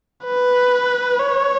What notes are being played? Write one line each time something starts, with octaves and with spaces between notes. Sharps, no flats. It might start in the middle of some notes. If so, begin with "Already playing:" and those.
B4
C#5